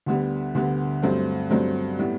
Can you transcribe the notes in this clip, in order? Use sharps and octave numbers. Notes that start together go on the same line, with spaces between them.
D2 D3 G3 B3
D2 D3 G3 B3
G2 F#3 A3 C4
G2 F#3 A3 C4
A2 G3 B3